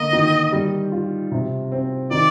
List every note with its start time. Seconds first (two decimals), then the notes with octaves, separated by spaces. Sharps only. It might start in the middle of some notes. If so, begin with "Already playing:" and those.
Already playing: D3 A#3 D#5
0.13 D#3
0.52 G3
0.92 F4
1.32 C3
1.72 C4
2.11 D#3 D5